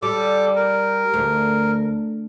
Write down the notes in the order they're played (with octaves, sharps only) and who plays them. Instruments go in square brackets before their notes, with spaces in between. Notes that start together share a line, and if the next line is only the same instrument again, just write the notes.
[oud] G3 [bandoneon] A4 D6
[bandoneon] A#4
[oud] D2